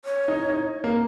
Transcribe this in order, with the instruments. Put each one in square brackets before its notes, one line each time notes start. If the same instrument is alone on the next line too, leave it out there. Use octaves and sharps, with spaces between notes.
[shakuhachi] C#5
[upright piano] D#4
D#4
A#3